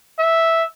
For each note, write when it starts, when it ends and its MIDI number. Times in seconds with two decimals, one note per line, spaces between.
0.19 0.64 76